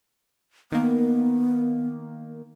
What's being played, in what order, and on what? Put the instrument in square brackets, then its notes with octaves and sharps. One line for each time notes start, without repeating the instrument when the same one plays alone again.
[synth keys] D#3 A#3 [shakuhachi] B3